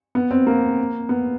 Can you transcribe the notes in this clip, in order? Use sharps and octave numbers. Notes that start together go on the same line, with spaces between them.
B3
C4
A#3
B3